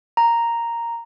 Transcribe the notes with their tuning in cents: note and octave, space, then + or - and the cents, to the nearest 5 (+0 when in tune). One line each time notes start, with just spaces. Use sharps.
A#5 +0